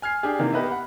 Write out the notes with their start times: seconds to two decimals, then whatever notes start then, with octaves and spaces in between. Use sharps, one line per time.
0.02 G#5 F6 G#6 C7
0.23 D4 G4 G#4
0.39 C3 D#3 E3 A#3
0.53 B3 G4 B4 D#5 E5
0.71 F#5 B5